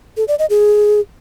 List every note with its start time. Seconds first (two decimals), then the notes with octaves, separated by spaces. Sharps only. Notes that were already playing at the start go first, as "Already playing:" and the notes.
0.17 A4
0.28 D5
0.39 D#5
0.50 G#4